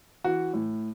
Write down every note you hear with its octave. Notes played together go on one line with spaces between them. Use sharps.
E3 F#4
A2